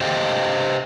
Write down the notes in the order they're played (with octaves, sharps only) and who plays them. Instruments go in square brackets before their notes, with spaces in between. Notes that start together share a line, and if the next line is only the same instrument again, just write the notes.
[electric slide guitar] G4 C5 D#5 F5 G5